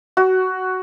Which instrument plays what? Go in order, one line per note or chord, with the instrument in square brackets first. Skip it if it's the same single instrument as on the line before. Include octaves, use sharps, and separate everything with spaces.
[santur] F#4